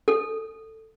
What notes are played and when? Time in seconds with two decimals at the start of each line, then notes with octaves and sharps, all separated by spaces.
0.08 A4